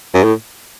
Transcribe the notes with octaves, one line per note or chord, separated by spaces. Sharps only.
F#2
A2